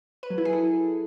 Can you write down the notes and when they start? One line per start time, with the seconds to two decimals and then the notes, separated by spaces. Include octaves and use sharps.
0.23 B4
0.30 F#3
0.38 E4
0.45 G#4
0.53 A4